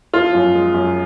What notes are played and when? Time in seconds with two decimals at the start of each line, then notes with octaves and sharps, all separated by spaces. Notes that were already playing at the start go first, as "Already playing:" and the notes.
0.14 F3 F4
0.34 F#2
0.54 G#3
0.74 F#2